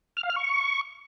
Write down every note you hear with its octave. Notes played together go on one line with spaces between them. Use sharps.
F6
F5
F6
C#6